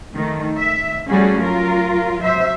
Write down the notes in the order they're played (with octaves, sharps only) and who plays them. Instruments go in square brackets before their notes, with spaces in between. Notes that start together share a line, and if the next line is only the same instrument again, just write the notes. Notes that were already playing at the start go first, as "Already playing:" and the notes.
[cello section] D#3 A3
E5
G3 A3 C#4 F#4 G#4
F#3 F4 A#4
F#3 C5 E5